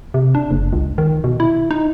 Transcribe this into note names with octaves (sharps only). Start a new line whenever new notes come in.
C3
D4
F#1
C#2
D#3
B2
E4
D#4